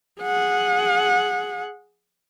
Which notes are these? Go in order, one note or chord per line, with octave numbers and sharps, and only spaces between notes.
G#4 F#5